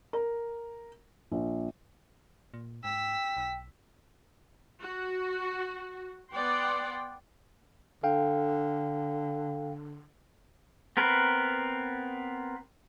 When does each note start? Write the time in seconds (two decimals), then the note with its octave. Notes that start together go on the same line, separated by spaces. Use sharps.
0.13 A#4
1.32 A#1
2.54 A#2
2.84 G#2 G5 E6 B6
3.37 B1
4.82 F#4
6.32 B3 D5 F#5 G5 C6
8.03 D3 A4 F5 G5
10.97 B3 C4 A#4 B4